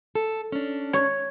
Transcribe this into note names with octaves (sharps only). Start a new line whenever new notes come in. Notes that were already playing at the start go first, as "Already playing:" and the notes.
A4
C#4 D4
C#5